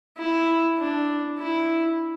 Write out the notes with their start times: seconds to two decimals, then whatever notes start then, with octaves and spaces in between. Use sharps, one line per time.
0.18 E4
0.78 D4
1.39 E4